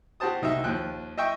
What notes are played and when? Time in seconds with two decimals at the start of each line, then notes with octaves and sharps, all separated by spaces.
0.20 F#4 G4 C5 A5 D#6
0.42 C2 D#4 F#4 E5
0.64 D#2 F3 G5 F#6
1.18 D#5 E5 G5 C#6